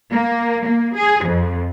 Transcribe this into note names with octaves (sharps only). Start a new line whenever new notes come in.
A#3
A#3
G#4
F2